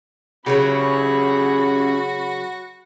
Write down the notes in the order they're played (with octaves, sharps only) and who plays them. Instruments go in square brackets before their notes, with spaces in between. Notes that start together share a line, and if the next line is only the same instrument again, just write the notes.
[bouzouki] C#3 E3 F#3 [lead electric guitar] C#4 G4 [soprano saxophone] F#4 [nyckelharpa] B5